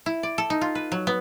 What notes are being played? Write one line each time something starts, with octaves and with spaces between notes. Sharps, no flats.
E4
D5
A4
D#4
F4
B4
F#3
B3